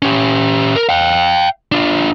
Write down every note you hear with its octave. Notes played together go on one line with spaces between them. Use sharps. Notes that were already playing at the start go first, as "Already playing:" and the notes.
C#4 G4
A#4
F5 G5
D4 F4